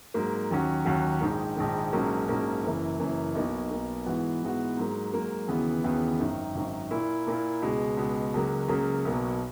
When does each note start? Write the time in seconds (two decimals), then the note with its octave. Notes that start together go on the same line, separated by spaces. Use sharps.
0.14 G#2 F#3 A#3
0.50 D#2 D#3 F#3 C#4 F#4
0.85 D#2 D#3 F#3 C#4 F#4
1.21 A#1 G#2 D#3
1.57 A#1 G#2 D#3
1.92 A#1 G#2 F#3 A#3 C#4
2.28 A#1 G#2 F#3 A#3 C#4
2.63 F#1 F#2 E3 A#3
2.99 F#1 F#2 E3 A#3
3.35 B1 B2 A#3 D#4
3.71 B1 B2 A#3 D#4
4.06 G#2 E3 B3 F#4
4.42 G#2 E3 B3 F#4
4.77 G#2 F#3 A#3
5.13 G#2 F#3 A#3
5.48 D#2 C#3 E3 B3 F#4
5.84 D#2 C#3 E3 B3 F#4
6.19 G#1 F#2 D#3
6.55 G#1 F#2 D#3
6.91 A#2 A#3 E4
7.27 A#2 A#3 E4
7.62 C#2 B2 G#3
7.97 C#2 B2 G#3
8.34 C#2 C#3 F#3 A#3
8.68 C#2 C#3 F#3 A#3
9.05 B1 B2 F#3 A#3